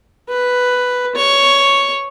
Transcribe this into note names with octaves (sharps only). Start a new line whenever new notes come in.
B4
C#5